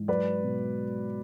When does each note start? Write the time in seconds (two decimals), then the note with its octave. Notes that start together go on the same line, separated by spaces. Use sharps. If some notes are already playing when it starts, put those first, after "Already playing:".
Already playing: G#2 E3
0.08 F#3 B4 D5
0.43 B2